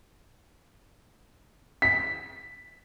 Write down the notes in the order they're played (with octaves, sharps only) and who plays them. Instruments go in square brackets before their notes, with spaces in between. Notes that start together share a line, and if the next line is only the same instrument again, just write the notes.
[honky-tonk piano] B6